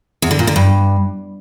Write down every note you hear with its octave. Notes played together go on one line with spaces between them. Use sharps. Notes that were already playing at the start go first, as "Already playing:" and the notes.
E2
D3
A#2
D3
G2